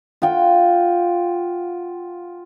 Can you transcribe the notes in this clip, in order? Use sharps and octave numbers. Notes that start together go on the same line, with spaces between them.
F4 F#5 G5